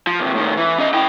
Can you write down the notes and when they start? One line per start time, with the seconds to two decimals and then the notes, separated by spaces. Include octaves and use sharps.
0.07 F3
0.19 D#2 C3
0.35 A2 D#3
0.57 E3
0.78 C#4 D#5
0.94 E4 G5